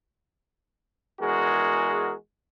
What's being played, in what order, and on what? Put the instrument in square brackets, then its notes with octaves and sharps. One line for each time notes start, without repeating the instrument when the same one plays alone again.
[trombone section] E2 G#3 F#4 G#4 A#4